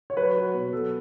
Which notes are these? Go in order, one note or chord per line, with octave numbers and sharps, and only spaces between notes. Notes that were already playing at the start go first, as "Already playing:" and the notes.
C#5
F#3 B4
F#3
B2
F#3 A4